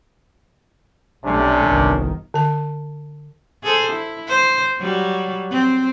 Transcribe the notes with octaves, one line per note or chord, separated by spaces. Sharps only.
B1 C3 G3 A3 C#4 D4
G1 C2 D#3
D3 A5
G#4 A4 C5
E4
C5
F#3 G3 F#4
C4